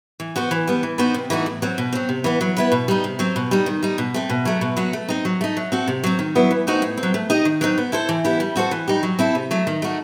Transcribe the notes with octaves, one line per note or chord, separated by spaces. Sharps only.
E3
B3 F#4 C5
E3
G3 B3
E3
B3 D#4 F#4 C5
C3
E3 A3 D#4 F#4
A2
F#3 C4
B2
F#3 C4
C3
E3 B3
F#3
B3 E4 B4
B2
G3 D#4
C3
F#3 C4
B2
G3 D#4
D#3
G3 D#4
B2
A3 C4
B2
F#3 A3
B2
F#3 B3 F#4
A3
C4 D#4
F#3
A3 D#4
F#3
C4 F#4 A4
C3
F#3 C4
D#3
F#3 B3 E4
E3
A3 C4 D#4 F#4
A2
C4
F#3
A3
D#4 G4 D#5
D#3
F#3 C4 D#4
B3
E4 A4 C5
E3
B3 E4 G4
G3
C4 F#4 A4 C5
E3
G3 D#4 G4
F#3
C4 E4 A4
C3
F#3 A3
D#3
A3 D#4 F#4